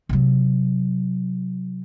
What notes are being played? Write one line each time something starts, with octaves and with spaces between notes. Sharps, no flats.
C3 F#3